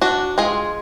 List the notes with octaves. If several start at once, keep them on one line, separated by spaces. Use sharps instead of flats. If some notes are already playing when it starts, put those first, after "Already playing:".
D4 F#4
G#3 F4 G#4